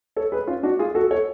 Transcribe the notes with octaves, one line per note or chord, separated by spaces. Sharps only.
A4 C#5
G#4 B4
C#4 F4
D4 F#4
F4 G#4
F#4 A4
A4 C#5